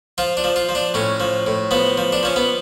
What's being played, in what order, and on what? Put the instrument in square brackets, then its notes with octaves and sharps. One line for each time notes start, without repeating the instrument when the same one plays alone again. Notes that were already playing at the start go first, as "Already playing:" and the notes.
[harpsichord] F3 F4
D4
F3
F4
F3
D4
A2 C#4
F3
A2
F3 B3
F3
D4
F3 C#4
B3